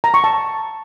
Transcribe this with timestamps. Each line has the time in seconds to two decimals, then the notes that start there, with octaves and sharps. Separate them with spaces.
0.04 A#5
0.14 C#6
0.24 A5